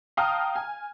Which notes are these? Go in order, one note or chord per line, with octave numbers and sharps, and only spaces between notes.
F5 G5 A5 A#5 D#6 F6
G#5